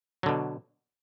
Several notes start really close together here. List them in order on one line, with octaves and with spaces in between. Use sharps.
F#3 D3 B2